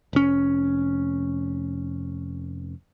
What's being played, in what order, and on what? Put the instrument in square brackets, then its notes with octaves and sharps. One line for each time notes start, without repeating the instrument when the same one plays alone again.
[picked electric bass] F1 C#4